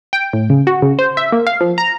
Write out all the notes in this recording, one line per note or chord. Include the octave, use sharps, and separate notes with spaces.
G5
A2
C#3
F#4
C#3
C5
E5
A#3
F5
F3
A#5